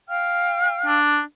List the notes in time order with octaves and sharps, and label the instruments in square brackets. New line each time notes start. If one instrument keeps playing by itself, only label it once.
[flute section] F5 G5 F6
[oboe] D4